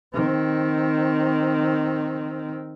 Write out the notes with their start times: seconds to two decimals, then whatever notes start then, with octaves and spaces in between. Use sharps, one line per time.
0.14 D#3 C4